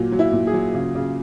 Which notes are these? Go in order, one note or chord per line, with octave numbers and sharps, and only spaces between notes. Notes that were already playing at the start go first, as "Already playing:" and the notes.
Already playing: A#2 F#3
F#3
E4
A#2
G#4
F#3
C#3
C#3